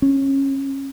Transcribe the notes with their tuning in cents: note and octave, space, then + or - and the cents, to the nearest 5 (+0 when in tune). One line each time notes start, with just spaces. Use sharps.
C#4 -25